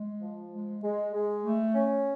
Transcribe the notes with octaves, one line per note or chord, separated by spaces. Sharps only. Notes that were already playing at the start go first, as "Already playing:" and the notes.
Already playing: G#3
F3
G#3
G#3
G#3
A3
C#4